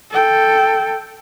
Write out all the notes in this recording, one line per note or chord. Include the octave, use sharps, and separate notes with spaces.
A4 G5